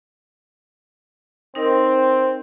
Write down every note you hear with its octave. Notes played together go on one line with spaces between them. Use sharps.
C4 D#4 A#4 D#5